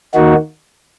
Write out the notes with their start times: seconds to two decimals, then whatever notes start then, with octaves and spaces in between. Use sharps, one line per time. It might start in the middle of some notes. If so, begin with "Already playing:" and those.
0.14 D#2 D#3 A#3 D#4 F#4